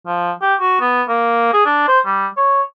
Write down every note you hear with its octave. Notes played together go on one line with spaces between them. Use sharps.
F3
G4
F#4
B3
A#3
G#4
D4
C5
G3
C#5